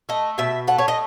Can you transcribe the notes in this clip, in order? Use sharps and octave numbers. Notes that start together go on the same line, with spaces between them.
A3 D#5
B2 E5
A3 F#5
C#5
D#5